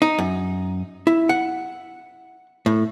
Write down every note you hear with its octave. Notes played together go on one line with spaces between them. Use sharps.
D#4
F#2
E4
F#5
A2